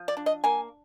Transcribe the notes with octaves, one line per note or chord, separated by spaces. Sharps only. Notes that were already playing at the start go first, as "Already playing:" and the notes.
Already playing: F3
D5
D4
D#5
A#3 G#5